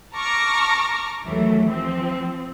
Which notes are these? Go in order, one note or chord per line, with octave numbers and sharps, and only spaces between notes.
A5 A#5 C#6 D6 F6 A#6
D#2 E3 F#3 A3
F3 C4